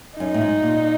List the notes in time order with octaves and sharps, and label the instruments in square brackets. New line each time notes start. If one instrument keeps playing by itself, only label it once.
[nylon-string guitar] F#2 [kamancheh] D#4
[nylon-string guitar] A2
G#2
A#2